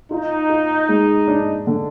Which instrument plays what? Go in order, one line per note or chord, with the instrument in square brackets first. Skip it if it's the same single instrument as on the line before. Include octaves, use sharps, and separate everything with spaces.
[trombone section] D#4 [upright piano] F4
[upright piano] F4
G#3
D4
D3